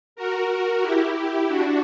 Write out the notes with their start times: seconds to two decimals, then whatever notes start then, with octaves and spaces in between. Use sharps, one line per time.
0.16 F#4 A#4
0.48 F#4 A#4
0.82 E4 G4
1.15 E4 G4
1.48 D4 F#4